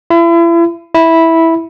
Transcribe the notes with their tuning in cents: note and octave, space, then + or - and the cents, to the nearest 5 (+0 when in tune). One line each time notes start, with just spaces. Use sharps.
E4 +35
E4 -10